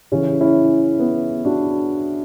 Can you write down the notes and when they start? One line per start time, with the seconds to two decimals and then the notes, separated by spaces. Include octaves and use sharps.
0.12 C#3 E3 C#4
0.41 C#4 E4
0.99 B3
1.45 D4 F#4